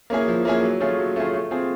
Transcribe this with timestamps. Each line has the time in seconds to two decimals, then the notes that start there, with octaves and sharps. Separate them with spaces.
0.10 A#3 C#4 E4 G#4
0.28 F3
0.45 A#3 C#4 E4 G#4
0.63 F#3
0.80 A3 C#4 F4 G#4
0.98 F#3
1.16 A3 C#4 F4 G#4
1.33 A3
1.51 C4 F4 G#4